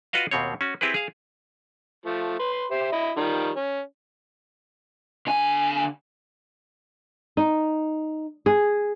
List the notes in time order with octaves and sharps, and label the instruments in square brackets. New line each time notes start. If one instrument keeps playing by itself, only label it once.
[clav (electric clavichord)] F4 F#4 B4 D#5 F5
D#2 B2 C4 C#5
C#4 F#4
C4 E4 G4 G#4 B4
G#4 F5
[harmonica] F3 A3
B4 C6
G4 C5 E5
E4 D#5 E5
D#3 F3 G3
C#4
[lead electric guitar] D3 G#5
[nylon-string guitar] D#4
G#4